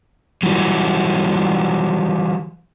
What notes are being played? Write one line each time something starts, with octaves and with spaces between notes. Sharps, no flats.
E3 F#3 G3